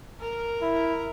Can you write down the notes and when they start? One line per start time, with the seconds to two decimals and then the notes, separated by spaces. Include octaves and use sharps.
0.20 A#4
0.61 E4